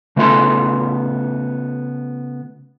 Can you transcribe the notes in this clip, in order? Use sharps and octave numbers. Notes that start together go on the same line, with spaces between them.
C#3 A3 B3 F4 A4 C6